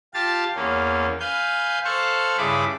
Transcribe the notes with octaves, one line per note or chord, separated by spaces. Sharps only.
F4 G4 F5 A5 A6
E2 A#3 C#4
B4 F5 G#5 G6
A4 C5 F5 C#6 F#6
G2 C#3 E4 G#4 B5 D6